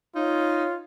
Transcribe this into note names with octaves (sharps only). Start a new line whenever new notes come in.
D#4 F4 C#5